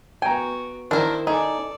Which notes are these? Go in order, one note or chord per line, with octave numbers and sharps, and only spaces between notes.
B3 F#4 G5 G#5 A#5
D#3 D4 E4 A#4 C5
D#4 G#4 A4 D5